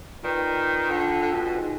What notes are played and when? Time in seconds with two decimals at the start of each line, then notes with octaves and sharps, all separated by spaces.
0.23 D#3 F4 B4 D5 G5
0.89 D3 F4 C5 G5
1.22 D3
1.33 B2
1.45 B2
1.55 D#4 G#4 C5 D#5 G#5